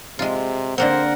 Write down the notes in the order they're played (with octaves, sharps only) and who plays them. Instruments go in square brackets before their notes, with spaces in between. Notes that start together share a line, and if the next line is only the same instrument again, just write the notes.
[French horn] C3 [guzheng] G#3 F4
[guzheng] D3 A#3 C4 [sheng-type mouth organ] A#4 F#5 [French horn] C5